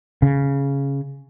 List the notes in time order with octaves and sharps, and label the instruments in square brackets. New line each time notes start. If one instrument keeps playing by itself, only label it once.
[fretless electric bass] C#3